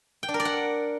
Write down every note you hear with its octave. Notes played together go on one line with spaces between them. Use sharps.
G5
D4
A#4
D5
F#5